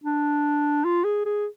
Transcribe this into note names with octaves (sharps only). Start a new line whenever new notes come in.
D4
F4
G#4
G#4